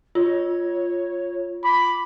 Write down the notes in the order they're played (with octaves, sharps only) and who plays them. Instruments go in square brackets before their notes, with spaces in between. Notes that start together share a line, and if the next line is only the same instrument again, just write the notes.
[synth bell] F4 [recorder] C#5
[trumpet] B5 [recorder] D6